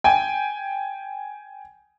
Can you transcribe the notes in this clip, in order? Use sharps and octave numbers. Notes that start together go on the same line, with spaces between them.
G5 G#5